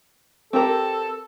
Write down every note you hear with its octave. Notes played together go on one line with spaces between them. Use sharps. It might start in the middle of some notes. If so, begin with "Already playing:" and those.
C4 G4 A4 A#4